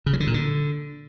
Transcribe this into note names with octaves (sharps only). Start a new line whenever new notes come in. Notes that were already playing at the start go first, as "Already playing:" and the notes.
C#3
F#3
D3
A#2
D3